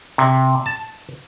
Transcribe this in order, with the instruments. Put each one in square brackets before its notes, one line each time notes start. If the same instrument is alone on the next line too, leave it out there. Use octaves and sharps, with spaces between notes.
[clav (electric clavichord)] C3
A5